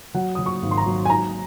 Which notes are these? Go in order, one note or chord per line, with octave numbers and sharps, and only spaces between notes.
F#3 F#5
F#3 D#6
C#6
G#1
C6
A#5
F#3
G#5
G#2 A#5